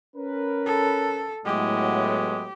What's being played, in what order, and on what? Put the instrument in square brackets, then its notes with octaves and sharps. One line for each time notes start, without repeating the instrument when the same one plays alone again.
[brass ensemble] C#4 A#4 B4
[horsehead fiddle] A4
[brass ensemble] A2 F#3 B3 [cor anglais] G#3 [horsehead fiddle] G4